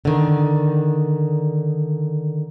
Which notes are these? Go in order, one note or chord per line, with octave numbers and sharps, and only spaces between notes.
D3 D#3